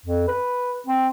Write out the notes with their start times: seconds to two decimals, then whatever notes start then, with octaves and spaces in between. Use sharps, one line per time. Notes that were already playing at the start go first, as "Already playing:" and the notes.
0.06 F2
0.28 B4
0.87 C4